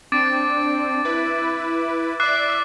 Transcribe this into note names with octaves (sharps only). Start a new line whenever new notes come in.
C4 D4 D6 A6 D7
E4 B4
D5 E5 D6 F#6 C7